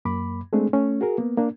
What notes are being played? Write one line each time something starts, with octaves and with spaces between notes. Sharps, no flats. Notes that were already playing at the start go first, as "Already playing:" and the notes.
F#2 A#3 B5 D6
G#3 A3 C4 D4 G#4
A3 C#4
F#4 G#4 A#4
A#3 B3
A#3 D4